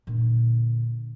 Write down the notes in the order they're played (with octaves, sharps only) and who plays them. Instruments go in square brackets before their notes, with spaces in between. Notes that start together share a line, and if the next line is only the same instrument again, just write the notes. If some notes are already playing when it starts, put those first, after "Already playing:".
[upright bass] A#2 D3